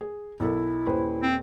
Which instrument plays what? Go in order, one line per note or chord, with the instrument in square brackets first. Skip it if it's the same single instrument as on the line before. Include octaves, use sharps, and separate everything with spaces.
[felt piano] G#4
[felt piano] B1 A4 A#4 [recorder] E4
[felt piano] D#1 B4 C5
[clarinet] C4